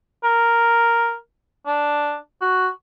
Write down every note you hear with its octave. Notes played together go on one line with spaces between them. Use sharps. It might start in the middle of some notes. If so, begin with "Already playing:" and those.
A#4
D4
F#4